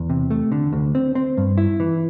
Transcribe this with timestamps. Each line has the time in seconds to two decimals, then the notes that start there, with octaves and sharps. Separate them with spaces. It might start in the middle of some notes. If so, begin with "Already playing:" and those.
Already playing: E2
0.10 C3
0.31 A3
0.52 D3
0.73 D2
0.95 C4
1.15 C4
1.37 G2
1.58 E4
1.80 E3